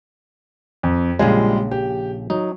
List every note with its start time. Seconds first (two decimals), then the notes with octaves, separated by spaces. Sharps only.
0.83 F2
1.19 A#1 C#3 G3 G#3 F4 G#5
1.71 G4
2.30 F#3 D#4